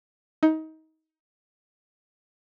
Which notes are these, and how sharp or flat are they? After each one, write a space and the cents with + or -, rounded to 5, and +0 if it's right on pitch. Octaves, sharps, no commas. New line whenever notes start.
D#4 +25